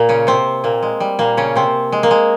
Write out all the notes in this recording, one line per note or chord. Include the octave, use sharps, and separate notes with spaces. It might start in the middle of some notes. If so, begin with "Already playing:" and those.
Already playing: A#2 A#3
C#3 C#4
C3 C4
A#2 A#3
G#3
G3
A#2 A#3
C#3 C#4
C3 C4
G#3
A#3
G#3